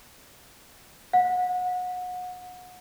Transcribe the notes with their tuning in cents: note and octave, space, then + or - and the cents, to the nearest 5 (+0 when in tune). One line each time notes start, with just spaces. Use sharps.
F#5 -30